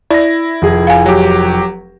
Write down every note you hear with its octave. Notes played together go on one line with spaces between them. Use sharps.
E4 D5 A#6
F1 G#4
F5 G#5
F#3 G4